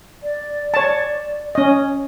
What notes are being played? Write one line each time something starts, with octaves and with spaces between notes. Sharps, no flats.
D5
C#5 A5
C#4 D#5